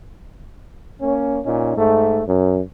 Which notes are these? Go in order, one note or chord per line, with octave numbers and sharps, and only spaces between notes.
A#3 C#4
A#2 C#4 D#4
G#2 A3
F#2